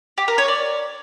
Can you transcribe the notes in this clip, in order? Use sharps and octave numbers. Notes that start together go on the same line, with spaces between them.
G4
A#4
C#5
D5